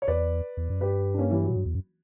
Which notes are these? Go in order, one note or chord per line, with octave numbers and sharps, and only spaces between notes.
C#5
E2 B4 D5
E2
F#2
G2 G4 B4
D4
A#3 C#4
E3 G3
F#3
A#2
G2
E2
F#2